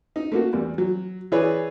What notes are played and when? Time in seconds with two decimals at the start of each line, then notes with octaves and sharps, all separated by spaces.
0.16 D#4
0.32 A3 A#3 F#4
0.53 E2 G3
0.78 F#3
1.32 E3 E4 G#4 B4 C#5 D5